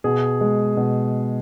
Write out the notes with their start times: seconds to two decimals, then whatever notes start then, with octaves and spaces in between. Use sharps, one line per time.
0.04 B2 G#4
0.41 G#3
0.77 B2